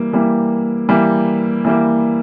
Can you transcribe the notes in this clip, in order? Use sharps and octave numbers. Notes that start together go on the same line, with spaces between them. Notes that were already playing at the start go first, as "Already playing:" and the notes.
Already playing: E3 G3 A#3
E3 G3 A#3
E3 G3 A#3
E3 G3 A#3